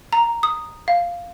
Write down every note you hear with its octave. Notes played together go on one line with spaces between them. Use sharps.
A#5
D#6
F5